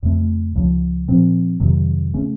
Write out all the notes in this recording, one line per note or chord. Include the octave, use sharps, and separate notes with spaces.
F2 C#3 A3
C#2 C#3 F3
A#2 F3 C4
F2 C3 D#3 F#3
C#3 A3 C#4